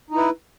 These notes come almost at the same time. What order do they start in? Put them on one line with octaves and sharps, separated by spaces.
D#4 E4 B4